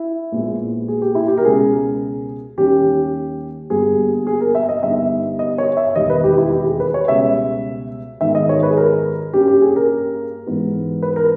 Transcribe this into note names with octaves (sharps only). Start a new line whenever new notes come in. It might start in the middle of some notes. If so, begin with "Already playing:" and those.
Already playing: E4
A#1 A#2 G#3 B3
G#4
G4
E4
G4
A#4
C#2 B2 G#3 C#4 G#4
D#2 D#3 G3 C#4 G4
G1 G2 G3 A#3 G#4
G#4
A#4
E5
D#5
G1 G2 G3 B3 D#4 E5
D#5
C#5
E5
E1 D#2 D#3 G3 A#3 D#5
B4
G4
E4
G4
G#4
B4
C#5
C#2 B2 G3 E5
G#2 D#3 G#3 B3 E5
D#5
C#5
B4
G#4
A#4
G2 G3 A#3 C#4 G4
G4
G#4
A#4
G#2 E3 G#3 B3 D#4
B4
A#4